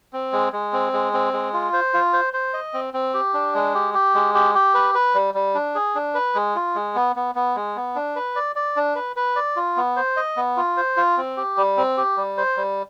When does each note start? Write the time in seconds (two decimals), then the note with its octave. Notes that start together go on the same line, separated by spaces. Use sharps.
0.13 C4
0.33 G#3
0.53 G#3
0.73 C4
0.93 G#3
1.13 C4
1.33 G#3
1.53 F4
1.73 C5
1.94 F4
2.13 C5
2.33 C5
2.54 D#5
2.74 C4
2.94 C4
3.14 G4
3.34 D4
3.55 G#3
3.74 G4
3.94 G4
4.14 G#3
4.34 G4
4.55 G4
4.74 B4
4.94 B4
5.15 G3
5.34 G3
5.55 D4
5.75 G#4
5.95 D4
6.15 B4
6.35 G#3
6.55 F4
6.75 G#3
6.95 B3
7.16 B3
7.35 B3
7.56 G#3
7.76 B3
7.96 D4
8.16 B4
8.36 D5
8.56 D5
8.76 D4
8.95 B4
9.16 B4
9.36 D5
9.56 F4
9.76 B3
9.96 C5
10.17 D#5
10.37 B3
10.57 F4
10.77 C5
10.97 F4
11.17 C4
11.37 G4
11.57 G3
11.77 C4
11.97 G4
12.17 G3
12.37 C5
12.57 G3